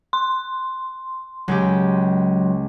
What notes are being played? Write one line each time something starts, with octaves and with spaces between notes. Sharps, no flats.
C6
C#2 F#3 G#3 G4